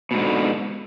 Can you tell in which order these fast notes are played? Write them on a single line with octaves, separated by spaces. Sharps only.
B2 G#2 D3